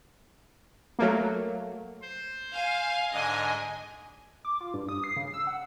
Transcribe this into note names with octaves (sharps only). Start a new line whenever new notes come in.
F#3 A3 A#3
C5
F5 G#5
G#2 D3 D#5 G#5
D6
F4
G2
D#6
C7
C#3
E6
F#5